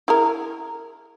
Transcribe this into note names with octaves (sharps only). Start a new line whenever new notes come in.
E4 G#4 A#4